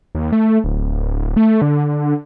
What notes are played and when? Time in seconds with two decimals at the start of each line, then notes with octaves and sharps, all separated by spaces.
0.15 D#2
0.32 A3
0.64 D1
0.92 D1
1.37 A3
1.62 D3